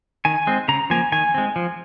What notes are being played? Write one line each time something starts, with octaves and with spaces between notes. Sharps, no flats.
D#3 G#5
G#3 C4
C#3 A#5
F3 A#3 G#5
D#3 G#5
G#3 C4
F3